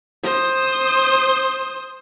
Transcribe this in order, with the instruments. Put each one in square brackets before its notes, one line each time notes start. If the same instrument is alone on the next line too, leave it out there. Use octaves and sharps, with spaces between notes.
[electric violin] C5 D#6